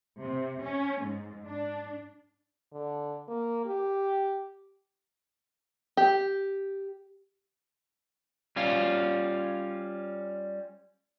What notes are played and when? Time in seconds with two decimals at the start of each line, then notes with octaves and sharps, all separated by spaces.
0.19 C3
0.62 C#4
1.02 G#2
1.46 D4
2.72 D3
3.28 A#3
3.65 G4
5.97 G4
8.56 G3 C#4 F4